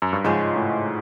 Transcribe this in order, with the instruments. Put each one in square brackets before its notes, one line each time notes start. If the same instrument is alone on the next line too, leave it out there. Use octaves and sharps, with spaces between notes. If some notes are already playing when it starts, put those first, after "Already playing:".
[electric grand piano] F#2
G2
[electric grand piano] G#2 [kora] C#3 F3 G#3 C#4
[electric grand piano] A2